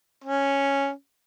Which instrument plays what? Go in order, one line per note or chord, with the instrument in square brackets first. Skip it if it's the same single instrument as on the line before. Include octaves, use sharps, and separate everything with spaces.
[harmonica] C#4